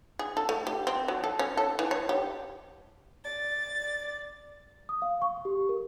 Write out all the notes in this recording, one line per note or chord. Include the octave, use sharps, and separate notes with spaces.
G#4
A4
A3
G4
C4
F#3
A4
C#4
A4
E3
C#5
G4
D5 A6
D#6
F5
C#6
G4
A#4